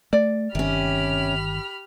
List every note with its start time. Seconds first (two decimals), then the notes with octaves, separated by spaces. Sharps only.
0.13 A3 D5
0.55 G1 C3 D#3 C#4 G4 B5 F6